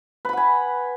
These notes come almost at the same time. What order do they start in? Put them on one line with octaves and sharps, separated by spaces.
B4 B5 F#5 G#5